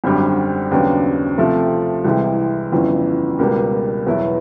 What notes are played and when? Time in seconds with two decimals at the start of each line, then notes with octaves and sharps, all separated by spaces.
0.04 G#1 F#2 D3 G3
0.71 D#2 C#3 F#3 B3 D4
1.38 C3 F3 A3 C4
2.05 C2 C3 E3 G#3
2.72 G1 F2 C#3 E3
3.39 C#2 B2 G3 A#3
4.06 E2 B2 F#3 B3 E4